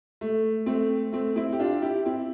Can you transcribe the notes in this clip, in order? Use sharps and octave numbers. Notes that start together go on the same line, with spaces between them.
A3
A3 C4
A3 C4
C4 E4
G4
D4 F4
E4 G4
C4 E4